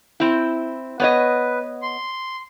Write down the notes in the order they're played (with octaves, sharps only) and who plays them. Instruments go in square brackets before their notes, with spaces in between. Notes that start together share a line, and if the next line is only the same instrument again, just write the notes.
[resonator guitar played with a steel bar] C4 E4
[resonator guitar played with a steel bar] B3 C#5 D#5 [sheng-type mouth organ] B4
[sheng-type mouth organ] C6